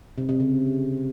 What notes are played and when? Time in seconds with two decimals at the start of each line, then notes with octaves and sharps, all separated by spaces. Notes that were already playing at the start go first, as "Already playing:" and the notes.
0.18 C3
0.29 C3
0.40 C#3